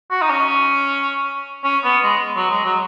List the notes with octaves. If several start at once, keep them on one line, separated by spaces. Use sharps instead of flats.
F#4
D#4
C#4
C#4
B3
G#3
F#3
G#3
F#3